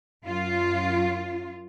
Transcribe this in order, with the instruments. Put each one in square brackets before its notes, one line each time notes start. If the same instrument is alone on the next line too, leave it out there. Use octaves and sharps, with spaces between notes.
[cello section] F#2 F4